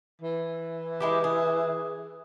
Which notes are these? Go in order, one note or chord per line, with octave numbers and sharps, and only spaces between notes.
E3
G#3 E4 G4
G#4